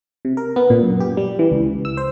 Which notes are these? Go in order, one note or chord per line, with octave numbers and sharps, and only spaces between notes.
C3
A#4
B3
A#2
F#2
G4
G3
E3
C#2
E6
C5